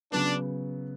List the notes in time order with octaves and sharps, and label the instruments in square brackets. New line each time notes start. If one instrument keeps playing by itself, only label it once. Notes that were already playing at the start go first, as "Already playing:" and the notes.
[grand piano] C#3 F#3 B3 [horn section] D4